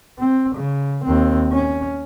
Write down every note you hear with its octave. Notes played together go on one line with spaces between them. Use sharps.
C4
C#3
D#2 C4
C#4